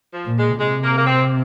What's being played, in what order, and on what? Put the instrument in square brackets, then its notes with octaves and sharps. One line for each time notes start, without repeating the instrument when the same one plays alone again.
[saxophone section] F3
[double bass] A#2
[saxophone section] G#3
[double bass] C3 [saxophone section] G#3
[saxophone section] A#3
A#3
C4